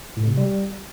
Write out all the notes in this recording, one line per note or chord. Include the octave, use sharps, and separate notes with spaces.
A2
C3
G3